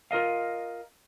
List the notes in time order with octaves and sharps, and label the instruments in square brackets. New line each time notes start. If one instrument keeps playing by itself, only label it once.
[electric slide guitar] F4 A#4 D#5 F5